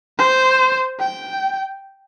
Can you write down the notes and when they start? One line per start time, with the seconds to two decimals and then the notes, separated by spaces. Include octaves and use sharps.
0.18 C5
0.99 G5